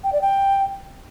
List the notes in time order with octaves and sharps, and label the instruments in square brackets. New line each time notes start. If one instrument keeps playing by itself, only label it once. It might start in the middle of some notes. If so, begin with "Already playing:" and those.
[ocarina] G5
D5
G5